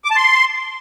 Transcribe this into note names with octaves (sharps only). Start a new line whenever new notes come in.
D6
A5
C6